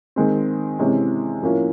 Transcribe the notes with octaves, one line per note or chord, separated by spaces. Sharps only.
D#3 G#3 C4
C3 E3 G#3 C#4
A2 F3 A#3 C#4